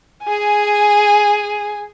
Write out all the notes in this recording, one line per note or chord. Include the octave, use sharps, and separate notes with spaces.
G#4 G#5